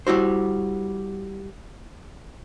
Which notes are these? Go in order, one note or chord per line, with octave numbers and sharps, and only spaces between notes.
G3 E4 F#4 C5